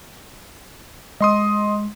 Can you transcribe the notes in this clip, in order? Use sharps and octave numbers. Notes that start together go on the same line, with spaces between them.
G#3 D#5 C6 D#6